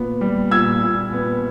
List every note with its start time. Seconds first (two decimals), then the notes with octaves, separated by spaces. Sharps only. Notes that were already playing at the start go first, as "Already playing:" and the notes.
Already playing: A#2 B3
0.21 G3
0.51 A#2 E6 G#6
0.82 A#2
1.13 B3